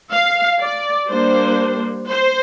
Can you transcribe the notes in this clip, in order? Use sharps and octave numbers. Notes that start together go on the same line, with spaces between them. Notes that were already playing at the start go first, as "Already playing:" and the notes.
F5
D5
G3 A#3 D4 C5
C5